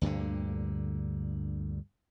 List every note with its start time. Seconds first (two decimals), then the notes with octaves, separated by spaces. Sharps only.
0.01 D2 G2 A#2 D3